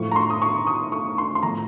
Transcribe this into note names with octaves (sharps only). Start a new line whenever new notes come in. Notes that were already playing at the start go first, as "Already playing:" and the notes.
Already playing: A2 F3 C#6
A#5
C6
D#6
C#6
D#6
C#6
C6
C6
A2 F3 A#5